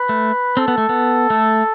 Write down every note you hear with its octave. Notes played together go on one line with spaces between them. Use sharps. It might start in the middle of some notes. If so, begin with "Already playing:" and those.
Already playing: B4
A3
C4 A4
B3
A3
B3
A3